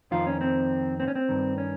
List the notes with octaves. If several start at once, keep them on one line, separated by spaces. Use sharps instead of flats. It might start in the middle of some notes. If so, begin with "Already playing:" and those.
F2 D#3 F4
C#4
C4
C4
C#4
C4
G2 D#3
C#4